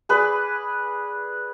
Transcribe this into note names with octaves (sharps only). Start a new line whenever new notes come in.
G#4 B4 D5